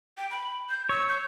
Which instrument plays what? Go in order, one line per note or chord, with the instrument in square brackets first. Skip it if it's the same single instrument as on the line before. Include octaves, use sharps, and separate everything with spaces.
[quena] G5
B5
G6
[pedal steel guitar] C#5 [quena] E6
[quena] G6